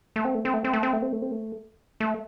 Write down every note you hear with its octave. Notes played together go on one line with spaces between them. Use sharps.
A3
C4
A3
C4
A3
C4
A3
C4
A3
C4
A3
C4
A3
A3